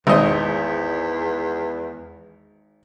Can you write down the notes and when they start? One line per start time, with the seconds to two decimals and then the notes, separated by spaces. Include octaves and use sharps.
0.07 G#1 E2 C5 D#5